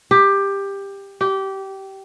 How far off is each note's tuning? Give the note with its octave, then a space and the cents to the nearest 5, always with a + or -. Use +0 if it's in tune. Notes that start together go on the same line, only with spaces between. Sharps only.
G4 +15
G4 -20